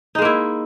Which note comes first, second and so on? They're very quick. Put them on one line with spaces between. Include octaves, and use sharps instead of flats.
D#4 G#3 A#3 E4